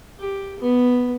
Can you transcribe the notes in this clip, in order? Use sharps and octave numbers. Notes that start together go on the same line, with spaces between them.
G4
B3